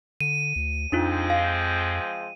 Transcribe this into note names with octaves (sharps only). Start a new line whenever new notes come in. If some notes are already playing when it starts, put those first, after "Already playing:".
D3 D#7
D2
F2 F3 G#3 C4 D4 D#4 F4
F5